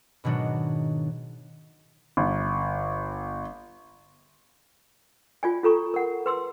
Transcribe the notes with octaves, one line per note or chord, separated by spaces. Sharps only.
G#2 B2 D#3 F#3 D4 F#4
G1
F4 D5 G#5
F4 A4 A#5 C#6
A#4 F#5
B4 C6 E6